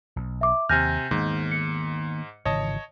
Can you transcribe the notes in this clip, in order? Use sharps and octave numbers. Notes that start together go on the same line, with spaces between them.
B1
E5 D6
D#2 C3 G#5 F6 G6 A#6
G#2 D#3 A#3 B3
C#7
G#1 C#3 E3 C#5 D#5 A5